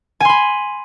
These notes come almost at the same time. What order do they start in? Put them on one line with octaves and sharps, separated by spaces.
G#5 C6 B5